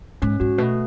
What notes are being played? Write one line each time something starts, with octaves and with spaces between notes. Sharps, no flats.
G#2 C#4
G#2 F#4
B2 A3